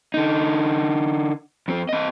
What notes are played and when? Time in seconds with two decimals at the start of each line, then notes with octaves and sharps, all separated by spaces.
0.14 D3 D#4
1.68 F2 C4
1.89 C4 D#5